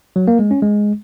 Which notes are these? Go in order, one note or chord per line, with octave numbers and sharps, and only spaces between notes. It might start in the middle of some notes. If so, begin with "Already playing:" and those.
F#3
A#3
G#3
C#4
G#3